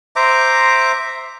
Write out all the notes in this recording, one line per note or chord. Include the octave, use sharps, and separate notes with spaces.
C5 E5 A#5 D6